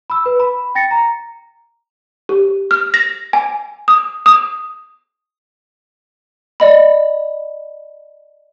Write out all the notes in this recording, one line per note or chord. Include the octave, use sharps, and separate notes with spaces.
B5 E6
B4
B5
G5 A6 A#6 C#7
A#5
G4
F6
A#6
G#5
D#6
D#6
D5 D#5 B5